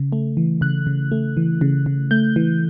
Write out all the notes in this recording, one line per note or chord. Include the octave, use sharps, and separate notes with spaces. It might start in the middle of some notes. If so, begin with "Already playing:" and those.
Already playing: C#3
A3
E3
C#3 F#6
C#3
A3
E3
C#3
C#3
A3 G6
E3